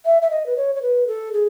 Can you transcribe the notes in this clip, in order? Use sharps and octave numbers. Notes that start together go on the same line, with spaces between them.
E5
E5
D#5
B4
C#5
C#5
B4
A4
G#4